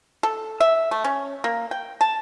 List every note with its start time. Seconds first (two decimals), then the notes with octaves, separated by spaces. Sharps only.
0.23 A4
0.60 E5
0.91 A3
1.04 C#4
1.44 A#3
1.71 G5
2.01 A5